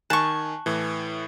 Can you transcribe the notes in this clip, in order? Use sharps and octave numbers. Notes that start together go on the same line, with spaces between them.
D#3 G#5 A5 C#6 F#6
A2 E3